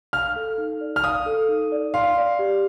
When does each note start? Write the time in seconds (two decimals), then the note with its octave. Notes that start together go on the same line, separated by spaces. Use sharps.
0.13 F5 F6
0.36 A4
0.58 D#4
0.81 D5
0.96 F6
1.04 F5 D#6
1.26 A4
1.49 D#4
1.72 D5
1.94 F5 C6
2.17 D5
2.39 G4